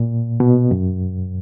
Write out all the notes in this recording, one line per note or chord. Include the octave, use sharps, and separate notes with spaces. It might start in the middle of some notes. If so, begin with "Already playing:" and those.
Already playing: A#2
B2
F#2